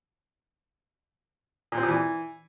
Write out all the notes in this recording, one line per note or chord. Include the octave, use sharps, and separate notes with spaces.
A#2
C4
A#2
E3